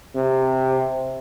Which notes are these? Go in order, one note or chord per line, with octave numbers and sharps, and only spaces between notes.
C3